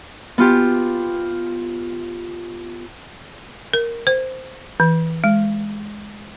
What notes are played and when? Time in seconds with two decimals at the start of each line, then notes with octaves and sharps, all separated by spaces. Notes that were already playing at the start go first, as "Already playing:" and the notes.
0.38 B3 F4 G4
3.73 A#4
4.07 C5
4.80 E3
5.24 G#3